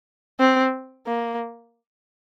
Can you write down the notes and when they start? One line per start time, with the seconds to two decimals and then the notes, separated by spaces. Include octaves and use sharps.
0.40 C4
1.07 A#3